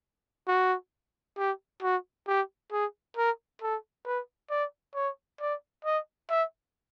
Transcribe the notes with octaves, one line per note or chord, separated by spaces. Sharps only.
F#4
G4
F#4
G4
G#4
A#4
A4
B4
D5
C#5
D5
D#5
E5